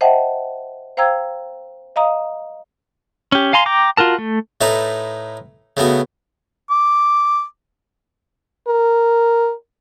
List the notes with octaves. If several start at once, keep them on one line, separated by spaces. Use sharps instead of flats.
C5 D#5 E5 F#5 G5 A5
C5 F5 G5 A#5 E6 G#6
D#5 F5 A#5 D#6
C#4 G4
F5 G#5 A#5 C6
G5 A#5 D6
F4 F#4 A#4 A5
A3
A2 A3 D#4 B4 A5
C#3 A3 B3 F#4
D6
A#4